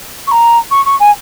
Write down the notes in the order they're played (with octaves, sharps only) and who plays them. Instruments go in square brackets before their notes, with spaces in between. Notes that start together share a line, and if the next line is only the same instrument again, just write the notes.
[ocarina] C#6
A#5
C#6
C#6
G#5